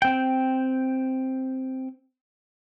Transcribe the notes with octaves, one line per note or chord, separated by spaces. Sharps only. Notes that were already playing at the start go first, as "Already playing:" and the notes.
C4 G5